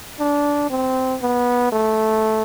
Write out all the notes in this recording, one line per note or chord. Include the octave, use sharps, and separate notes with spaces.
D4
C4
B3
A3